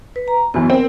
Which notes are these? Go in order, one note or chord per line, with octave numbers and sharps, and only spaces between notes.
B4
A#5
F#2 B2 E3 B3
C4 A#4